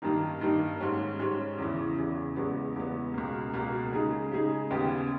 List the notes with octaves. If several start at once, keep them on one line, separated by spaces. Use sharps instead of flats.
G2 D#3 G3 A#3 D#4
G2 D#3 G3 A#3 D#4
G#2 G3 C#4
G#2 G3 C#4
E2 C#3 E3
E2 C#3 E3
E2 C#3 G#3 B3
E2 C#3 G#3 B3
C#2 B2 A#3
C#2 B2 A#3
C#3 G#3 D#4 G#4
C#3 G#3 D#4 G#4
D#2 C#3 G3 B3 G4